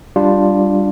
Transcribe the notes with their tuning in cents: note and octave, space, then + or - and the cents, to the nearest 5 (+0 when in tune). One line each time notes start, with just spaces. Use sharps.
G3 +0 D4 +0 F4 +0